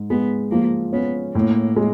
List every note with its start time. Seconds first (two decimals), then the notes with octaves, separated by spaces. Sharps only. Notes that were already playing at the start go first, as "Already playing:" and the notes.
Already playing: G#2
0.10 G#3 B3
0.51 F3 A#3
0.93 B3 C#4
1.35 A2 A#3
1.76 G#3